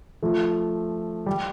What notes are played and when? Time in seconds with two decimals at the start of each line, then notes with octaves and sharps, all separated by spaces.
0.23 F3 A3
1.26 G3